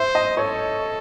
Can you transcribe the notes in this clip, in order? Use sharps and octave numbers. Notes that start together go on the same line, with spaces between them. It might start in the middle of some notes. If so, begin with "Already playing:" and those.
Already playing: C5 E5
D#5
A4 C#5